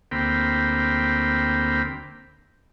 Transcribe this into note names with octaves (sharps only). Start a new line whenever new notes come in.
D2 A#3 C4 G5 B5